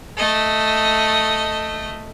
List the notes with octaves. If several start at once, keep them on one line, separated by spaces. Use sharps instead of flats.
A3 D#5